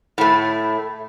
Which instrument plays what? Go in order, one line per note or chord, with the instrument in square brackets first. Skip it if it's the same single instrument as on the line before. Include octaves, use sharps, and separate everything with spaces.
[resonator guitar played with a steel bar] A2 A3